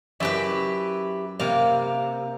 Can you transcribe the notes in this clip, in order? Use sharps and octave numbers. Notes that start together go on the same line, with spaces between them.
F#2 E4 G4 B4
C3 A#3 F5